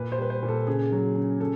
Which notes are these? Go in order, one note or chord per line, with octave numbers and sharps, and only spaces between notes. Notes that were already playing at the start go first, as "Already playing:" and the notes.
Already playing: A#2 B4
C5
G3 B4
C5
A#2
A4
C#3 G#4
F#3
C#3
C#3 A4